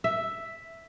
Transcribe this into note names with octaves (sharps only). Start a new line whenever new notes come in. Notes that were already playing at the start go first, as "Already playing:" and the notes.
E5